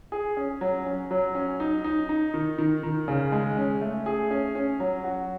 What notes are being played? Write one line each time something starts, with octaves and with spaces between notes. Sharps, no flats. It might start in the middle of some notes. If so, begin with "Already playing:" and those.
G#4
C#4
F#3
C#4
F#3
C#4
D#4
D#4
D#4
D#3
D#3
D#3
C#3
G#3
C#4
A3
G#4
C#4
C#4
F#3
F#4